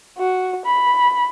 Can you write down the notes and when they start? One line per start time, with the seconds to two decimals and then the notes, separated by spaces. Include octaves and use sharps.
0.18 F#4
0.65 B5